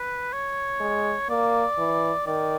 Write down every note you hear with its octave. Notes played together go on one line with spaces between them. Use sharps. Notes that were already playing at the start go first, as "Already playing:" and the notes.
Already playing: B4
C#5
G#3
A#3 D5
E3
D#3 D5